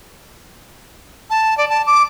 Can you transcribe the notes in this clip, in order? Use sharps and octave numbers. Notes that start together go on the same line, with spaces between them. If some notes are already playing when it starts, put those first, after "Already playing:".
A5
D5
A5
D6